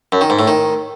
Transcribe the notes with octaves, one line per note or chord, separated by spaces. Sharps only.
F#2
D#3
G#2
A2
D#3